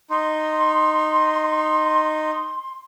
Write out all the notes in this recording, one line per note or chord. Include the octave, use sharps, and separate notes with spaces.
D#4 C6